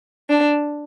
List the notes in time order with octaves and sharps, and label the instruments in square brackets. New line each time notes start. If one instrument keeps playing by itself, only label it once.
[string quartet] D4